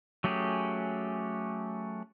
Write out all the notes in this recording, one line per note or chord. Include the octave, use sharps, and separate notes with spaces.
F#3 A3 C#4 G4 G#4